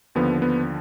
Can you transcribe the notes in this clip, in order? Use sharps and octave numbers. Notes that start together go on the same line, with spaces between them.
D#2 D3 F3 B3
B3